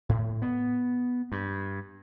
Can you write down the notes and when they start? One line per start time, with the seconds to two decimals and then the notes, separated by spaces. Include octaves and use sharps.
0.09 A2
0.42 B3
1.32 G2